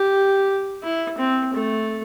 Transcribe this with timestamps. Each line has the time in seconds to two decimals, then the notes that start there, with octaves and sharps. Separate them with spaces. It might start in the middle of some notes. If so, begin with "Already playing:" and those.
Already playing: G4
0.83 E4
1.18 C4
1.54 A3